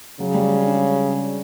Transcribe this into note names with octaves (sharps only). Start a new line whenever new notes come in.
C#3 F#3
G3
G#3
D4